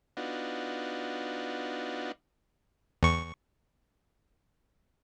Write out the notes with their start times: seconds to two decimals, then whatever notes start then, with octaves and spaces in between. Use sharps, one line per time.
0.17 B3 D4 D#4 F4 F#4
3.03 E2 C#6